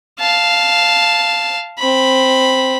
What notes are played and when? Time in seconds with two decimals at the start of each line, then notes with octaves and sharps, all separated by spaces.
0.20 F5 A5
1.78 C4 B5